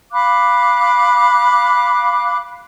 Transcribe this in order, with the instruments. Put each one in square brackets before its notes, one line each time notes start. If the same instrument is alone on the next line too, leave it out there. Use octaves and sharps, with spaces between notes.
[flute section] F5 B5 D6 F#6